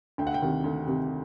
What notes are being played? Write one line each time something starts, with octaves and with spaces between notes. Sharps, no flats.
D2 G5
F#5
G5
C3 D#3
D2
C3 D#3